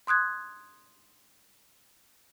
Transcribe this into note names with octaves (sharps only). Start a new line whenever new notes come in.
C6 D#6 F#6 G#6